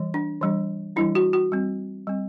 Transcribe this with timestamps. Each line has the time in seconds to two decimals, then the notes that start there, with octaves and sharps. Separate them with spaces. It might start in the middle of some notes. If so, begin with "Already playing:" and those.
Already playing: E3 G3
0.14 D4
0.41 E3 G3 D4
0.96 E3 G3 D4 E4
1.15 F#4
1.33 F#4
1.52 G3 C4
2.07 G3 C4